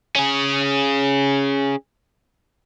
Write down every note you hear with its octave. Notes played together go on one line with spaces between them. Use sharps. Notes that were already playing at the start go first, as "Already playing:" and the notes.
C#4 G#4